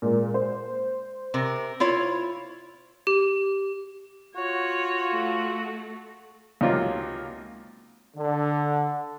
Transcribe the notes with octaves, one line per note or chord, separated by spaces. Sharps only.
A#2 G#3 A#3
C5
C3 A#4
E4 F4 C#5
G4
F4 F#4 C#5
A3
C#2 C3 F#3 A#3 D#4 F4
D3